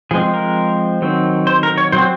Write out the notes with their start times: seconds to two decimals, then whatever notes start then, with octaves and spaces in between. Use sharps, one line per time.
0.11 F3 G#3 C4 G#4
0.34 A#4
1.02 D#3 F#3 C4
1.47 C5
1.63 A#4
1.78 C#5
1.92 F#3 C4 C5